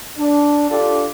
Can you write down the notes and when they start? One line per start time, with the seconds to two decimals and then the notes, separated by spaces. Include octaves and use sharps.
0.18 D4
0.71 D4 F4 G4 A4